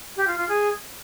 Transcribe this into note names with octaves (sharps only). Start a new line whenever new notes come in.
G4
F4
F4
G#4